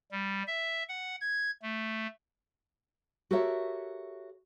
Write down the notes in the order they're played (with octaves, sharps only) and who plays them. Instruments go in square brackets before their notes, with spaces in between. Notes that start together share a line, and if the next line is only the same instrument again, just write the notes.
[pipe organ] G3
E5
F#5
G#6
A3
[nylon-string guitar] F#4 G4 A4 A#4 C#5 E5